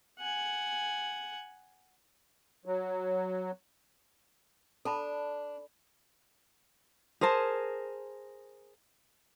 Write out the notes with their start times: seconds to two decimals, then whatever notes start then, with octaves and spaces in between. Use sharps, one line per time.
0.19 F#5 G#5
2.65 F#3
4.85 D4 A4 A5 B5
7.21 G#4 A#4 C5 A5